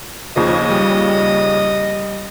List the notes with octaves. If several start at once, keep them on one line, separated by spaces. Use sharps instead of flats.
D#2 C#3 F3 D#5
G3